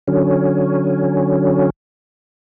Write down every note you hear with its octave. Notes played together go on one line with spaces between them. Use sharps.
D3 F#3 C#4